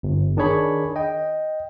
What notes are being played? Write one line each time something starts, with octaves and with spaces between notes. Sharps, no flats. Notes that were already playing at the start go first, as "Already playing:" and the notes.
G1
D#3 D4 G#4 C#5 B5
D#5 G5